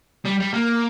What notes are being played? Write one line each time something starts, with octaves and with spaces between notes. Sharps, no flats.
G3
G3
A#3